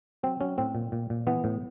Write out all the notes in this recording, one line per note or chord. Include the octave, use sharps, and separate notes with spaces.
F#3 C4
F#3 C#4
A2 C4
A#2
A#2
A#2
E3 B3
A2